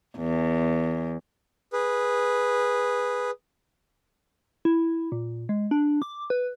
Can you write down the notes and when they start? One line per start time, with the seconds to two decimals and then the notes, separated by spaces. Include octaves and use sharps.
0.17 E2
1.73 G#4 B4
4.65 E4
5.12 A#2
5.49 G#3
5.71 D4
6.02 D6
6.30 B4